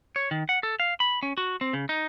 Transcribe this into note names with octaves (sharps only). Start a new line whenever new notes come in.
C#5
D#3
F#5
A4
F5
B5
C#4
F#4
C4
C#3
D#4